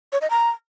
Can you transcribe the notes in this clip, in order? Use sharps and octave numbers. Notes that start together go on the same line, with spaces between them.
C#5
D#5
A#5